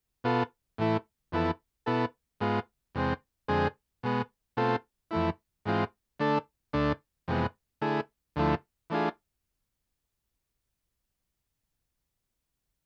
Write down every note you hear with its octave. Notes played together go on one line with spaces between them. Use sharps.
B2 B3 F4 A4
A2 E3 A3 E4
F2 E3 B3 E4 A4
B2 B3 E4 A4
G#2 G#3 B3 F4
E2 C3 G#3 C4
F2 D3 G#3 C4 G#4
B2 G#3 B3
B2 A3 C4 F4 A4
F2 E3 A3 E4
G#2 E3 G#3 C4 F4
D3 A3 D4 A4
D2 D3 A3 D4
F2 C3 E3 G#3 B3
D3 A3 E4 G#4
D2 D3 F3 A3 E4
E3 A3 D4 F4 G#4